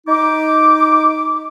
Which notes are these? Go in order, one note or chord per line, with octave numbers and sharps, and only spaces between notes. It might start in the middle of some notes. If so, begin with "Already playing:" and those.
D#4 D6